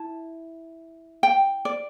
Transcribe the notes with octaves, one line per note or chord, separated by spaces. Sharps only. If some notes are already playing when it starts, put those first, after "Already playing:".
Already playing: E4 A5
G5
D5